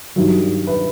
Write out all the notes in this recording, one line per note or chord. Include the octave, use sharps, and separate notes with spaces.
G2 D#3 F#3
B4